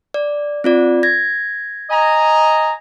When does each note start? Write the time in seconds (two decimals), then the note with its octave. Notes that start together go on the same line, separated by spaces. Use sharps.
0.14 D5
0.64 C4 F4 D5
1.03 G#6 A#6
1.90 D#5 G#5 A#5